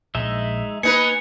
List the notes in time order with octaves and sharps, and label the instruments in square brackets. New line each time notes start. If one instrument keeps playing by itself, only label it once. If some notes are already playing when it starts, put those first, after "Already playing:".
[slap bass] A#1 [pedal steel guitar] G#3 D#4 E5
[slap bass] A#3 [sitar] B3 D#4 B4 [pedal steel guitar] G#5 [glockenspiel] C#7